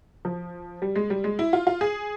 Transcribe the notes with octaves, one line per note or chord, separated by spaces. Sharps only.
F3
G3
G#3
G3
G#3
E4
F4
F4
G#4